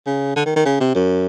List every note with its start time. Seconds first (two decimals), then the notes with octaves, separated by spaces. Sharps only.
0.06 C#3
0.36 D3
0.46 D#3
0.56 D#3
0.65 C#3
0.80 C3
0.95 F#2